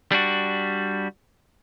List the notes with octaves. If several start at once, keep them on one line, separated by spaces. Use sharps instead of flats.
G3 D4 F#4